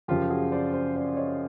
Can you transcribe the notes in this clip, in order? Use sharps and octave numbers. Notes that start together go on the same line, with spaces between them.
F#2 C#3 F3 F4 G4
F#4 G#4
C5 D5
C5 D5
C5 D5
C#5 D#5